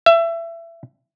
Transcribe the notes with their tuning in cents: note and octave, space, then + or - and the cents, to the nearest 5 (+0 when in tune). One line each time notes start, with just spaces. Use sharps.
E5 +25